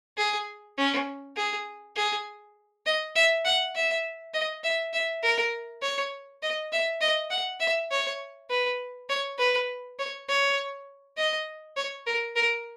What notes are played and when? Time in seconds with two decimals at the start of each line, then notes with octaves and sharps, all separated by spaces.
0.17 G#4
0.78 C#4
1.36 G#4
1.96 G#4
2.86 D#5
3.15 E5
3.45 F#5
3.75 E5
4.34 D#5
4.64 E5
4.93 E5
5.23 A#4
5.82 C#5
6.43 D#5
6.72 E5
7.01 D#5
7.30 F#5
7.60 E5
7.91 C#5
8.50 B4
9.09 C#5
9.38 B4
9.99 C#5
10.29 C#5
11.17 D#5
11.77 C#5
12.06 A#4
12.36 A#4